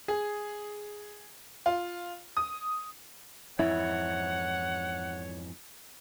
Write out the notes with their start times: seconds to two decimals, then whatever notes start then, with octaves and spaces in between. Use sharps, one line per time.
0.08 G#4
1.66 F4
2.37 D#6
3.59 F2 G#2 E3 E4 C#5 F#5